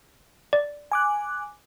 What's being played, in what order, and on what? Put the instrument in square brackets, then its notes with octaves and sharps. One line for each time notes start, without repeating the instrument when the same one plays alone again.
[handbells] D5
[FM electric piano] G#5 D6 F#6